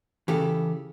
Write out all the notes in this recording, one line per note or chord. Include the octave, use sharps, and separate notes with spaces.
C#3 E3 G4 A4